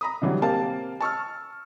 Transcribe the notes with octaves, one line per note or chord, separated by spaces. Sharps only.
A#5 B5 D#6
B2 D3 E3 F#3 G3
A#3 C4 G4 F5 A5
A5 C#6 E6 F6